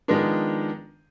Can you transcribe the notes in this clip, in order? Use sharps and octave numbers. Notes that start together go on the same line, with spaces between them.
D#3 F3 G#3 B3 D4